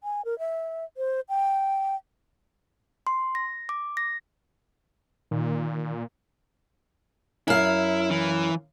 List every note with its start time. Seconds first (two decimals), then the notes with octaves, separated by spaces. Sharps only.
0.04 G#5
0.25 A#4
0.39 E5
0.97 C5
1.29 G5
3.07 C6
3.35 A#6
3.69 D6
3.97 A#6
5.31 A#2 D#3
7.48 F#2 E4 F5
8.10 E3